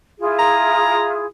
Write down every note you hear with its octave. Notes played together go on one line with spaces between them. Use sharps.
E4 F4 G#4
A#5